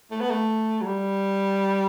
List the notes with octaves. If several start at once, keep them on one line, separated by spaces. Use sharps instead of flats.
A3
B3
A3
F#3
G3